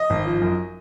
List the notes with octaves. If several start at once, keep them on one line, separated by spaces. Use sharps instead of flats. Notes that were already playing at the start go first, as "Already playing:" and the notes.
Already playing: D#5
G#1
F3
F#2